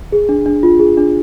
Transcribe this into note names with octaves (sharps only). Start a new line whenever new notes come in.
G#4
D4
D4
F4
G#4
D4